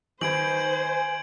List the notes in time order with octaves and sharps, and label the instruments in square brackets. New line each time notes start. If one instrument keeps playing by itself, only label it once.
[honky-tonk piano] D#3 B4 [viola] C5 [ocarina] G#5 [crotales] G#6 D7 F#7